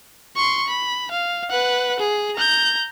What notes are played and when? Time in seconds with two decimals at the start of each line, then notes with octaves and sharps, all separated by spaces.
0.36 C6 C#6
0.68 B5
1.12 F5
1.50 B4 F#5
2.00 G#4
2.36 A#5 G6